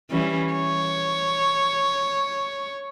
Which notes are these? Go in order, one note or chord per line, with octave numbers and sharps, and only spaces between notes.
E3 G3 C#4
C#5